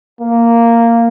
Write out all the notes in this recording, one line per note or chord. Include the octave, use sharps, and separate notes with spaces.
A#3